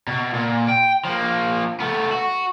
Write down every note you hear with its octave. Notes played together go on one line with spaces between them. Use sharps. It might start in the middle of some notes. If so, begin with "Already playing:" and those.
B2
A#2
G5
F3 A#3
A3 B3
F#4